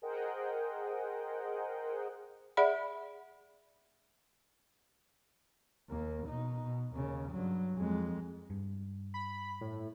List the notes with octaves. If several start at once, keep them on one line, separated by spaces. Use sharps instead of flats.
G#4 A#4 C5 D#5 F#5 G5
G#4 D5 E5 F#5 B5
D#2 A#3
B2 D#4
B2
D#2 C#3
G2 F#3
F2 G#3
G2
B5
A2